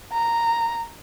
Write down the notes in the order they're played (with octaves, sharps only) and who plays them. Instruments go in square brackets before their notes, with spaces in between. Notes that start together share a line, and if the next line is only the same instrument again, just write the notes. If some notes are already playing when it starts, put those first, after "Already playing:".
[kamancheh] A#5